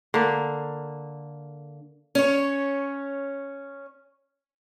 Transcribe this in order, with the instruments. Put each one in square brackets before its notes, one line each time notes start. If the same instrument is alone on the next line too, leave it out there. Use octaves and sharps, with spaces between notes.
[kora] D3 A#3
[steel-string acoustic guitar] C#4 C#5